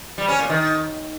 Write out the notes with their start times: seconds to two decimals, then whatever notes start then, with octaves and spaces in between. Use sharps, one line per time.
0.18 G3
0.28 C#4
0.39 A#2
0.50 D#3